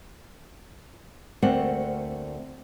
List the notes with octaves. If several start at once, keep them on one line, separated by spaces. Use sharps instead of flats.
D2 A3 A#3 C4 D5 F#5